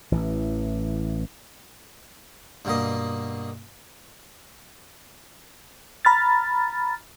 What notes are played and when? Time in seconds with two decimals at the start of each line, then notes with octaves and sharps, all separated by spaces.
0.12 A1 E3
2.65 G2 B2 A#3 D#5
6.05 A#5 B5 F6 A6